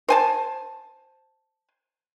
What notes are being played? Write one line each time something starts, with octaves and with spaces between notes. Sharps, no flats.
C5 G#5 A5